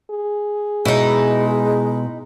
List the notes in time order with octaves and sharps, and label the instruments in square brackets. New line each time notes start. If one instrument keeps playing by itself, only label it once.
[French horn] G#4
[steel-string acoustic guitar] B2 [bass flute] G#3 [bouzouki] D#4 E4